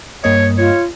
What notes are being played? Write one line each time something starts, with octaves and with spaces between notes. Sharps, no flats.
G2 A#3 C#5 D#5
F4 C#5